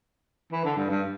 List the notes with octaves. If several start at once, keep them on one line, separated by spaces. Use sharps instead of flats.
E3
D3
G2
G2